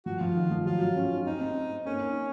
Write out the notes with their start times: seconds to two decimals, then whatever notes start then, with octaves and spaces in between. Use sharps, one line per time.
0.06 F3 F#4
0.20 F3 F4
0.35 D#3
0.51 F3
0.66 F#3 F4
0.81 F#3
0.96 C#4
1.11 D#4
1.26 C4 D#4
1.41 C4
1.86 A#3 C#4
2.02 D#4